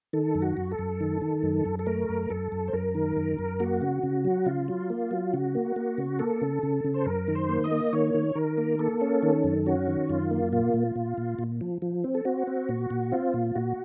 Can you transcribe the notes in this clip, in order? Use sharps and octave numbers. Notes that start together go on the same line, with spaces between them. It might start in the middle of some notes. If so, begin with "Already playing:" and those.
D#3 A4
F#2
F#4
F#2
A4
F#2
D#3
D#3
F#2
F#2
A4
A3 A#4
F#2
F#2 A4
F#2
C5
F#2 A#4
D#3
F#2
F#2
A#3 F#4
C#3
C#3
F#3
C#3 F4
F#3
A#3
F#3
C#3 F#4
A#3
A#3
C#3
A#3 A4
C#3
C#3
C#3
C5
F#2 A#4
D#3
C5
A#3
D#5
A#3
D#3 C#5
D#3
D#3 A#4
A#3
A#3 A4
C#4
D#3
F#2
C#4 F#4
D#3
F#2 F4
A#3
A#2 F4
A#2
A#2
A#2
A#2
F3
F3
C4
A4
C4 F#4
C4
A#2
A#2
C4 F4
A#2
A#2 F#4